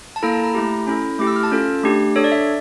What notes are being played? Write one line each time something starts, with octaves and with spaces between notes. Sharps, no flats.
A5
A#3 E4 A4 A#5
A5
A#5
A3 E4 G4
C#4 E4 A4
A3 E4 G4 D6
E6
F6
A5
C#4 F4 A4
A3 D4 G4
D4 A4 C#5
D5
E5